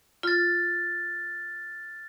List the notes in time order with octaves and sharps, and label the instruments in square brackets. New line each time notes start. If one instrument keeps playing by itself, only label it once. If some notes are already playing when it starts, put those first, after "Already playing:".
[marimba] F4 [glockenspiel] F6 A6